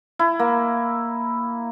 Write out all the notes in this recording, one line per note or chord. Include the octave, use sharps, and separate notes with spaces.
E4
A#3